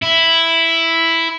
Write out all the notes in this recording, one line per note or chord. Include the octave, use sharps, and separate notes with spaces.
E4